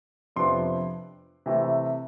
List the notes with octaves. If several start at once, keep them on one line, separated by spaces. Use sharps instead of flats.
F2 C3 F3 B3 D4 C6
C3 E3 A3